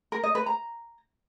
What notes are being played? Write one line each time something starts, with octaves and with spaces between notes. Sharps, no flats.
A#4
D#5
B4
A#5